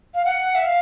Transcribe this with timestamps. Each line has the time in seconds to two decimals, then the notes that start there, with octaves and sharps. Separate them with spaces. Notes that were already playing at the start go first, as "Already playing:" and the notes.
0.14 F5
0.25 F#5
0.55 E5
0.65 F5